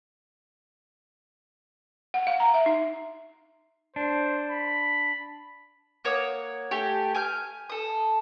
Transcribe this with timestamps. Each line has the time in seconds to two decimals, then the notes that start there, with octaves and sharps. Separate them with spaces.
2.14 F#5
2.27 F5
2.40 A#5
2.54 E5
2.66 D#4
3.96 D4 C5
4.50 B5
6.05 A#3 C#5 F#5 D#6
6.71 A3 G4 G#5
7.15 G#5 F6 G6
7.69 A4 D#6